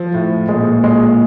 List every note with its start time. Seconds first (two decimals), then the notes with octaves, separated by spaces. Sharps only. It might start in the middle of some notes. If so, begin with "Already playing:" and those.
Already playing: F3
0.14 A2 A3
0.48 A#2 G#3 A#3
0.84 G#3